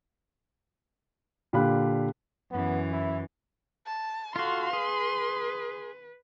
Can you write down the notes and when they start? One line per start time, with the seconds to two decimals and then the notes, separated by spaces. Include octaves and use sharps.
1.53 A#2 D3 G4 F5 B5 F#6
2.51 F#2 E3 B3
2.93 E4
3.86 A5
4.36 F4 F#4 A4 F5 C6
4.73 G#4 B4